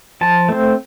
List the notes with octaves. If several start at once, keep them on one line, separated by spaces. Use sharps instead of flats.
F3 A5
A3 C4